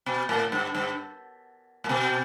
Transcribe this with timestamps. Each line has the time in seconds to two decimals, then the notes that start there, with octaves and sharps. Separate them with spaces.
0.06 B2
0.29 A2
0.52 G2
0.75 G2
1.84 A2
1.89 B2